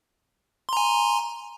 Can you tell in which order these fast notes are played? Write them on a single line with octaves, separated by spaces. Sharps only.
C6 A#5 G#5